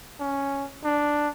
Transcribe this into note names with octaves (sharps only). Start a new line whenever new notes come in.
C#4
D4